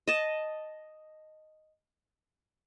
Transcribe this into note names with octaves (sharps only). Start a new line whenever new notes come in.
D#5 A5